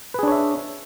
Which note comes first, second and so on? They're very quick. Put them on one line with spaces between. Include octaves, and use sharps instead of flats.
B4 G#4 D4 C#5 E5